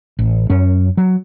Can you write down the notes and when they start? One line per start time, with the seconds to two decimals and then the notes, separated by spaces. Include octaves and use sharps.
0.19 A1
0.50 F#2 C#4
0.97 F#3